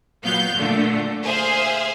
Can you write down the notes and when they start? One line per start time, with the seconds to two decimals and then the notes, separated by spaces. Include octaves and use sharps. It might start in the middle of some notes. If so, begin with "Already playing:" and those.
0.23 A#2 F#3 B3 F5 G6
0.57 A#2 D3 A3
1.23 G#4 C5 E5 F5